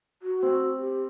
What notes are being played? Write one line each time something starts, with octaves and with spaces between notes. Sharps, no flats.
F#4
C4
G4